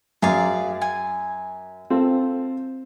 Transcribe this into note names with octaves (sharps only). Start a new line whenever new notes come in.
F#2 G#4 D5 F5
G#5
C4 F4 A4